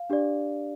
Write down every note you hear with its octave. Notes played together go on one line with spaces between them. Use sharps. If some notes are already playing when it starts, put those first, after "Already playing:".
Already playing: F5
D4 G4 D5